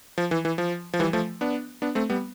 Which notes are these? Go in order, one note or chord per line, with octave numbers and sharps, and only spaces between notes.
F3
E3
E3
F3
F3
E3 G3
F3 A3
B3 D4
B3 D4
A3 C4
G3 B3